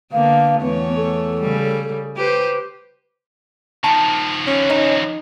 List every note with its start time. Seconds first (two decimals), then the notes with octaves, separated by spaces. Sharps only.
0.12 D3 A#3 B3 F5
0.61 E2 A3 B3 C#5
0.96 A4
1.41 C#3 G3
2.16 G4 B4 C5
3.84 D#3 F3 A5
4.47 C#4
4.70 D#4